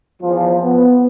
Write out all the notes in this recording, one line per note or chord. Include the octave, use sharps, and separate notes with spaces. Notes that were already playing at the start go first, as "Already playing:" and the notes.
E2 F3
B3